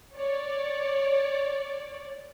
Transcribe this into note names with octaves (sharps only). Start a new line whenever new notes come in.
C#5 D5